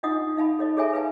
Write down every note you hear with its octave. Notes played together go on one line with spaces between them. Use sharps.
D4 D#4 F4 D#5 F#5 D#6
D#4 F5 A5 B5
A4 C#5 D#5
G#4 A4 C#5 E5 G#5 A#5
B4 F5 G#5 A5